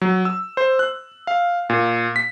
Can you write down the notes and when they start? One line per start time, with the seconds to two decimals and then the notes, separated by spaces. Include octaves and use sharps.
0.01 F#3
0.25 E6
0.57 C5
0.79 F#6
1.27 F5
1.70 A#2
2.16 B6